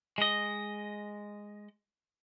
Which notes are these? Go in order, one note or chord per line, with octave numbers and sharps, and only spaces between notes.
G#3 D#5